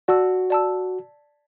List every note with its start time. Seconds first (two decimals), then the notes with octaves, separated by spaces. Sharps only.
0.08 F#4 D5 A5 E6
0.50 D5 A5 E6